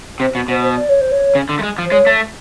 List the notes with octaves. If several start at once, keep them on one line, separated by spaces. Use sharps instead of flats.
C3 C5
B2
B2 C5
C5
D5
C#5
C5
C#5
C#3
D3
A3
G#3
F3
C5
G#3 C#5
A3